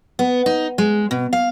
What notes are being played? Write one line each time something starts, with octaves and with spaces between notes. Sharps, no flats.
B3
D#4
G#3
B2
F5